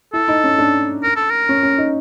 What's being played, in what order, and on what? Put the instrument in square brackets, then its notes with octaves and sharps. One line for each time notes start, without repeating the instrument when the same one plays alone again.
[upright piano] E4 [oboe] A4
[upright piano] D#4
C#4
D4
[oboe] A#4
A4
A#4
[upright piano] C#4
C#4
D#4